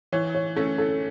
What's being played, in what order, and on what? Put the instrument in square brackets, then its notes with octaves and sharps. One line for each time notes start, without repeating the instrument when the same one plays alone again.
[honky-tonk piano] E3 [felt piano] C#5
[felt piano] C#5
[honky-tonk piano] A3 C#4 [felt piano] A4
[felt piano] A4